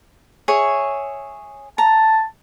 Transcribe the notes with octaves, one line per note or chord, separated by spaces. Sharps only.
G#4 C#5 E5
A5 A#5